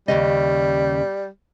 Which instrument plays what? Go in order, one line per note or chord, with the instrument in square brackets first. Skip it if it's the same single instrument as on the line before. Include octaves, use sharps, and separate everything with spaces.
[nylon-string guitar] D#2 C#3 D#5 [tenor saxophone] G3